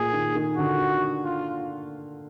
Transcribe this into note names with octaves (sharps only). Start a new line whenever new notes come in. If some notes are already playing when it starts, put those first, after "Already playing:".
Already playing: A#2 G#4
D#3
D#3
D3 F#4
F4